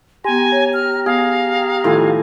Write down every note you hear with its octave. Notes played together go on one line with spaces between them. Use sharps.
B3 G4 G#5 A#5 C6
C#5
F6
B3 G#4 F5
A2 D#3 F3 G#5